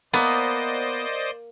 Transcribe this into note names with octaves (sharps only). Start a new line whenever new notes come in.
A#3 B3 C5 D5 D#5